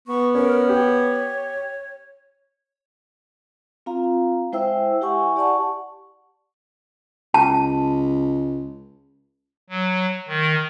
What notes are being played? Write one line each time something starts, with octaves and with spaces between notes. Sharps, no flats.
B3 C#6
C#4 A#4
G4 C#5
C4 F4 F5 A#5
G#3 E4 C5 E5 G5 E6
E4 G4 E5 F#5 G#5 C#6
G4 D5 F#5 A5 C#6
C#2 A5
F#3
D#3